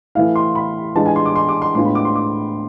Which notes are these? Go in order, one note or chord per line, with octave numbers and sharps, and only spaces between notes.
E3 A3 E4 F5
C6
B5
E3 G#3 D4 F4 A5
G#5
C6
D6
C6
D6
C6
A2 G#3 B3 D4 F4 C6
B5
D6
C6
D6